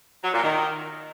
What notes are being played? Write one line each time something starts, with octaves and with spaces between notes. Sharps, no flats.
F#3
A#2
D#3